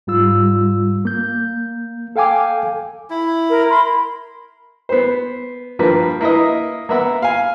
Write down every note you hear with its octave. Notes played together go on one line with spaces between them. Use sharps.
G#2 G3 F4 E6
A#3 G6
A4 F5 G5 G#5 D6
E4
A#4
B5 C6
B3 C5
G2 F3 A#3 B4
A#3 E4 B4 D#5
A#3 B3 E5 F#5
F5 G#5